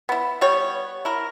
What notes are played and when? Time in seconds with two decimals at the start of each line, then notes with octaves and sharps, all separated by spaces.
0.09 B3 E4
0.41 G3 B3 C#5
1.05 E4 A#4